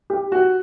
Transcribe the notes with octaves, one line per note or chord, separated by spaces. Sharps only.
G4
F#4